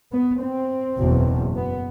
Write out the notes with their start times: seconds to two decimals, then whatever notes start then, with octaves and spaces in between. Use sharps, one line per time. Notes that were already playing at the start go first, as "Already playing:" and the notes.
0.12 B3
0.41 C4
0.98 F#1 E2 B2
1.56 B3